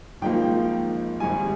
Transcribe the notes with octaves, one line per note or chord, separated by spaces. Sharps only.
G#1 G#2 F3 A#3 G5
G#1 G#2 G3 G#5